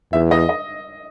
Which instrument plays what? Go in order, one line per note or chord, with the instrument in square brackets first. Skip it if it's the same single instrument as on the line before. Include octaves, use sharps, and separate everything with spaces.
[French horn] E2 [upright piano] E5
[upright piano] D#5
D#5